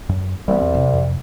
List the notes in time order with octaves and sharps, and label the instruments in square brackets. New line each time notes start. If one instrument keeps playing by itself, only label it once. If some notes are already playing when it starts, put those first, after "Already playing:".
[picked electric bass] F#2
[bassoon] C2 [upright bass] E3 [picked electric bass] G3 A3 B3
[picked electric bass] E2 C4
[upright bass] F#2 C3
[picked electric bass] F2